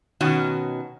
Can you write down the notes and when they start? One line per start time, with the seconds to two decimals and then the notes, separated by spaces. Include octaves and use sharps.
0.21 B2 D#3 C#4 F#4